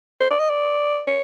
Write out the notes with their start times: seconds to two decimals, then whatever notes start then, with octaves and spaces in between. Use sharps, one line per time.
0.20 C5
0.31 D5
0.40 D#5
0.50 D5
1.07 C#5